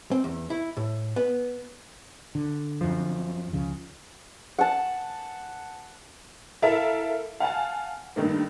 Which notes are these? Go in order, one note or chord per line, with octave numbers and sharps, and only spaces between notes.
C4
E2
E4
A2
B3
D3
F#2 F3
C#2 C#3 F3
F#5 A5
E4 A4 A#4 E5 F5
F5 F#5 G#5 A5
G2 D#3 A3 A#3